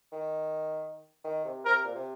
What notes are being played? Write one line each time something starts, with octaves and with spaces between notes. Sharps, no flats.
D#3
D#3
C3
C3 A#4
A#2
C3